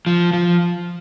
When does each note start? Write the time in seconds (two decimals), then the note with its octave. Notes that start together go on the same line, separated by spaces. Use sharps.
0.06 F3
0.33 F3